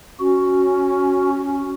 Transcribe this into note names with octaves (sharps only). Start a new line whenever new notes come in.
C#4 F#4